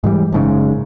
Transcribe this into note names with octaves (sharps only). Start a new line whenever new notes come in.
G#2 E3 G3
F#1 G#2 C#3